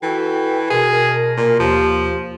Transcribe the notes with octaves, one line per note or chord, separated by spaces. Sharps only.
E3 F#4 A4 G5
B2 G#4 A#4
A#2
D#2 F3 G4